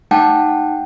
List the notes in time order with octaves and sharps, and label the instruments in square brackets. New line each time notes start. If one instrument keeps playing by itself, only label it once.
[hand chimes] A3 D#4 F#5 G5 A5